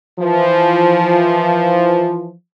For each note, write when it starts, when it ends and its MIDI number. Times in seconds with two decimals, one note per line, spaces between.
0.19 2.31 52
0.19 2.31 53